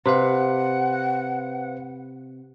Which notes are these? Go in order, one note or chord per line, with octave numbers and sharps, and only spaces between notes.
C3 B4 C5 F5 F#5